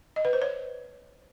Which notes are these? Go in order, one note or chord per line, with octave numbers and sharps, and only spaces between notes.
D#5
B4
C5
C#5